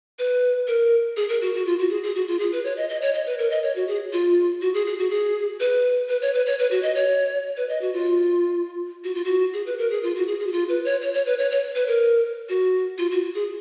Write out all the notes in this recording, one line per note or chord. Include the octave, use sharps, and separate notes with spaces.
B4
A#4
G#4
A#4
F#4
F#4
F4
F#4
G#4
G#4
F#4
F4
G#4
B4
C#5
D#5
D#5
C#5
D#5
B4
A#4
D#5
C#5
F#4
G#4
F4
F#4
G#4
G#4
F#4
G#4
B4
B4
C#5
B4
C#5
B4
F#4
D#5
C#5
B4
D#5
F#4
F4
F#4
F4
F#4
G#4
B4
A#4
G#4
F4
F#4
G#4
G#4
F#4
F4
B4
C#5
C#5
C#5
B4
C#5
C#5
B4
A#4
F#4
F4
F#4
G#4